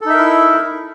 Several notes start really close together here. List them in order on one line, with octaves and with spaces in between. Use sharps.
A4 D#4 E5 A#4 E4